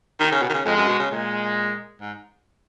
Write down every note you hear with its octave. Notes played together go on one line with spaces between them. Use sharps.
D#3
C#3
B2
D#3
C#3
F2 G#3
F#2
B2
C#3
A#2 G#3
G#2